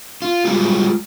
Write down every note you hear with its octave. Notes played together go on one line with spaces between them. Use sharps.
F4
G3 G#3 F4 F#4 G#4